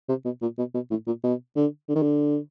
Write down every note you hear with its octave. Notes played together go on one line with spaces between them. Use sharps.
C3
B2
A#2
B2
B2
A2
A#2
B2
D3
D3
D#3
D3